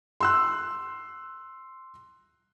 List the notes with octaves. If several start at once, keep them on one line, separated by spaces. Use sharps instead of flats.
C6 E6 F#6